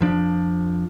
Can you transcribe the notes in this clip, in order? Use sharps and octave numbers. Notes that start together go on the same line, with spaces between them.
F2 F3 D4